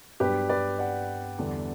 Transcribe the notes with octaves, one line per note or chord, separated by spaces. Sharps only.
G2 F#3 B3 D4 G4 B4
B4 D5
D5 F#5
E2 D3 G3 B3 D4